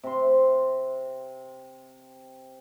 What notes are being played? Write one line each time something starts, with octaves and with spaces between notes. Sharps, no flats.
C3 C6